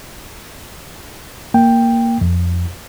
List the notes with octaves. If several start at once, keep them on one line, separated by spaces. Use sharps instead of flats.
A#3 G5
F2